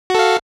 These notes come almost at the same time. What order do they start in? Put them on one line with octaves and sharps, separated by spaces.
F#4 A4 F5